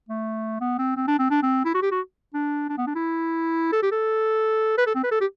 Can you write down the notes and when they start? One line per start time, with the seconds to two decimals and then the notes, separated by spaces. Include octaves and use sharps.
0.09 A3
0.61 B3
0.79 C4
0.97 C4
1.08 D4
1.19 C4
1.31 D4
1.43 C4
1.65 E4
1.75 F#4
1.82 G4
1.92 F#4
2.34 D4
2.69 D4
2.78 B3
2.87 D4
2.96 E4
3.73 A4
3.83 G4
3.92 A4
4.78 B4
4.87 A4
4.95 C4
5.04 B4
5.12 A4
5.21 G4